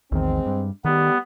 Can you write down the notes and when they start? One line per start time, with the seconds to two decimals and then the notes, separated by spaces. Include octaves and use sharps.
0.12 A#1 E2 D#3 G#3 C4
0.46 G2
0.85 D#3 G3 A3 B3 G4